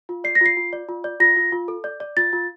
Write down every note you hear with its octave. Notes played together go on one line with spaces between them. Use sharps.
F4
D5 C7
A#6
F4 C7
F4
D5
F4
D5
F4 A#6
F4
F4
A4
D5
D5
F4 A6
F4